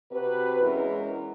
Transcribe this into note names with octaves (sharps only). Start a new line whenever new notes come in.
C3 F#4 B4
E2 G#3 C#4 E4 A#4